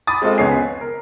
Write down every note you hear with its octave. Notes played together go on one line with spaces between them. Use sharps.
B5 D6 D#6 A6
G#3 C4 F4 A4 D#5
C#2 B3 C#5 G#5 C7
B6
A#4